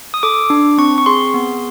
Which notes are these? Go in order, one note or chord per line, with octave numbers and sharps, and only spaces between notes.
D#6
A4 D6
D4
C4 C#6
C#6
G#4 C6
B3